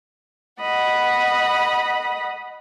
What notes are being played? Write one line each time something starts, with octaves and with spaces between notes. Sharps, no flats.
D#5 F#5 B5